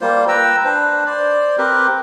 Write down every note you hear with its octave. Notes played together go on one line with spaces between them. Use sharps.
G3 A#3 F4 C5
B4 G5 A#5 E6
D4 B4 C5
C5 D5
C4 G4 A#4 B4